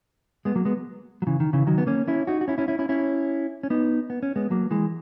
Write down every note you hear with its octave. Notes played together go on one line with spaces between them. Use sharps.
G#3 B3
F#3 A#3
G#3 B3
F#3
C#3 E3
D#3
C#3 E3
D#3 F#3
B3
A#3 C#4
C#4 E4
D#4 F#4
F#4
C#4 E4
C#4 E4
C#4 E4
C#4 E4
C#4 E4
C#4
B3 D#4
B3
C#4
G#3 B3
F#3 A#3
E3 G#3